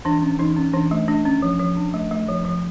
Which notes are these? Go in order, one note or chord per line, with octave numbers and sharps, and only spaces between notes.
E3 D4
C#4
E3 D#4
C#4
E3 D4
A3
A3 D4
C#4
F3
F3
D4
A3
A3
F3
F3